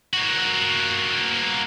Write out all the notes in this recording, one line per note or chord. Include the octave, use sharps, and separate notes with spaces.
A#3 F#4